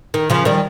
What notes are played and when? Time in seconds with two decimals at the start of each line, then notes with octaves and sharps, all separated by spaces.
0.14 D#3
0.30 C#3 F3
0.45 D#3 G3